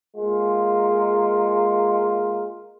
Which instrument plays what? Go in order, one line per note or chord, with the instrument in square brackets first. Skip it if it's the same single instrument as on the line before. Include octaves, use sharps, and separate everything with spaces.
[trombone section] G#3 A#3 F4